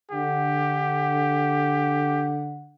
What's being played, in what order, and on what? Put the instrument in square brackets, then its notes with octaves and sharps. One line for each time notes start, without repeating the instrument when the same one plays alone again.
[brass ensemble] D3 F#5 [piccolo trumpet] G4